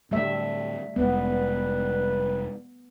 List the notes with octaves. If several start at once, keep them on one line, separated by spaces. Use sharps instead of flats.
A2 D3 G3 A3 E5
F1 F2 G3 G#3 B3 B4